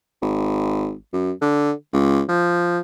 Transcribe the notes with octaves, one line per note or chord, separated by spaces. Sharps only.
G#1
F#2
D3
C#2
F3